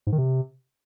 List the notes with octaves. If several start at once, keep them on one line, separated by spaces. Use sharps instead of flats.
G#2
D#3
C3